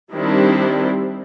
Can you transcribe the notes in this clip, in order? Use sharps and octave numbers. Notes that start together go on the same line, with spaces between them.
D#3 G3 C4 D4 E4